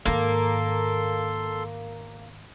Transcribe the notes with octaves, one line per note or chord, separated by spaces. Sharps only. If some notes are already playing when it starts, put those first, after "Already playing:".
G#2 D#3 A#3 A4 C6